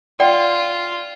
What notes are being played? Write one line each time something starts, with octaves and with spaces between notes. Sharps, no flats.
F4 D5 F#5 G5